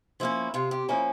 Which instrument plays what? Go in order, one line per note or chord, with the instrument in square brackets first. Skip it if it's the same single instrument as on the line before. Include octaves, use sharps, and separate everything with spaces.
[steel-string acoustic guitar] F3 A#3 C#4 E4
C3 F4
G4
F3 A#3 C#4 E4